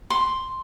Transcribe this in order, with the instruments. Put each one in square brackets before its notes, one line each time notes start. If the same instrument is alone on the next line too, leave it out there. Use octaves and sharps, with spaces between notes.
[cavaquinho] C6